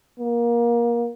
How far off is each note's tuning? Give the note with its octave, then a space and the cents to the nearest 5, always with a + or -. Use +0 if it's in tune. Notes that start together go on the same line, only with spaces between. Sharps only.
A#3 +25